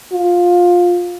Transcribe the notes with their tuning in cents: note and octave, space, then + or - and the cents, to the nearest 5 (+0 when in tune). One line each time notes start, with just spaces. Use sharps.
F4 +15